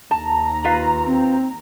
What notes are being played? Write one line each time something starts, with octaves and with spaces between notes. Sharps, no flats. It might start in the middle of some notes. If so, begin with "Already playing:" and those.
D#2 A5 A#5
F4 B4 F5
C4